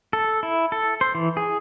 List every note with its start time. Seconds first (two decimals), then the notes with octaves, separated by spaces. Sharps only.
0.13 A4
0.43 E4
0.72 A4
1.01 C5
1.15 E3
1.37 G#4